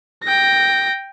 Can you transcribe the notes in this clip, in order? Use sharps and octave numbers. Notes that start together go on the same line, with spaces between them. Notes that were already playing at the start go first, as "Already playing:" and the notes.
G5 A#6